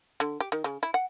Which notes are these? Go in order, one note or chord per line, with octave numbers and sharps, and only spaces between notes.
D3
G4
D#3
C#3
E4
F#5